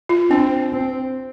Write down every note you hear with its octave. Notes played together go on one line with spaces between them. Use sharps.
F4
C4 D4
C4